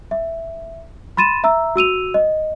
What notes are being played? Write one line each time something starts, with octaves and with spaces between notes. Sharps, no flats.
E5
B5 C6 A6 D#7 E7
E5 A#5 E6
F#4 E6 D#7 F7
D#5